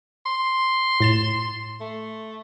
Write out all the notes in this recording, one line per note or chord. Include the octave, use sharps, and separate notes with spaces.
C6
A2 A6 E7
A3